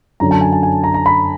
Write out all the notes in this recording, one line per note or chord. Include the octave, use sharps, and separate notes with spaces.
F#2 D3 F#3 A#5
A5
G#5
G#5
G#5
A#5
A#5
B5